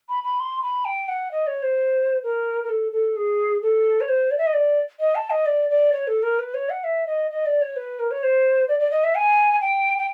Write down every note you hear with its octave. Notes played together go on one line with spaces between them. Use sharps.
B5
B5
C6
B5
G5
F#5
D#5
C#5
C5
A#4
A#4
A4
A4
G#4
A4
C#5
C5
D5
E5
D#5
D5
D#5
A5
D#5
D5
D5
C#5
A4
A#4
B4
C#5
F#5
E5
D#5
D#5
D5
C#5
B4
A#4
C#5
C5
D5
D5
D#5
E5
G#5
G5
G5